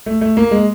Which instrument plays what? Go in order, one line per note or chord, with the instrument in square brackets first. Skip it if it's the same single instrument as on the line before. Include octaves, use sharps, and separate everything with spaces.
[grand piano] A3
A3
A#3
G#3